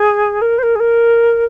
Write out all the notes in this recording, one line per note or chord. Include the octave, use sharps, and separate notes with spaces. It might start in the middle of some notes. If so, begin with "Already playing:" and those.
Already playing: G#4
A#4
C5
A#4
G#4
A#4